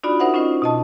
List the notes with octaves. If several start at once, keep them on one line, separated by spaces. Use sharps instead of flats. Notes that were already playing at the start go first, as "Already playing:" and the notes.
D4 D#4 F4 F#4 D5 B5
D#4 A#4 C5 E5 F#5
C#4 D#4 F4 C5 D#5
B2 D#5 A5